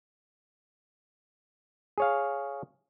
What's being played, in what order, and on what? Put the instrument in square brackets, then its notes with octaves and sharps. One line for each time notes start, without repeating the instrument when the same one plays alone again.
[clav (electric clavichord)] G#4 C#5 F5